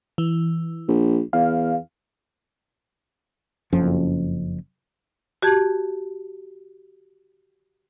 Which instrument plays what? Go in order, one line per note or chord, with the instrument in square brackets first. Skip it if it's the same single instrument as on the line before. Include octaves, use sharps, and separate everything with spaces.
[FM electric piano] E3
[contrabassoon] A#1
[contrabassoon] E2 [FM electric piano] F5
[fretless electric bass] F#1 F2 F3 C#4
[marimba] F#4 G4 A5 G#6